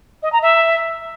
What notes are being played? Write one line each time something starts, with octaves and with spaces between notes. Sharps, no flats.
D#5
A#5
E5